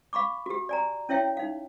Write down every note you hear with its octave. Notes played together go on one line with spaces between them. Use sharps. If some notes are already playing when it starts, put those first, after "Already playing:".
F5 B5 C#6 D6
F#4 G4
D5 G#5 A#5
C#4 E4 C#5 E5 G5
D#4 F5